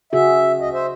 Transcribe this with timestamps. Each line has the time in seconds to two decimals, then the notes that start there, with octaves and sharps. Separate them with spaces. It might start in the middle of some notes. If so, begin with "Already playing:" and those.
0.13 C#3 F#4 G#4 E5
0.61 D2 D#5
0.73 C5 E5